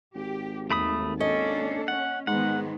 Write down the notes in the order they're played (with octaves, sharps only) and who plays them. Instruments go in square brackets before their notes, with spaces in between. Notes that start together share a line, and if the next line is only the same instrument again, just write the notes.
[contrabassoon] G#1 [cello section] G4
[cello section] D#2 [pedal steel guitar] A3 B5 D#6
[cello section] A#3 D4 A4 [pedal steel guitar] C#4 [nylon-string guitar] D#5
[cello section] C#4 [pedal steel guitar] F#5
[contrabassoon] G#2 [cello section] D#3 G#3 B3 [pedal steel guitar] F#5